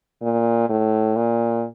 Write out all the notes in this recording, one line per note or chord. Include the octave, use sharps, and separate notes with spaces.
A#2
A2
A#2